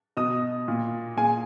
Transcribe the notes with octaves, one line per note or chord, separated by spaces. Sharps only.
B2 D#5 D#6
A#2
A#2 G#4 G#5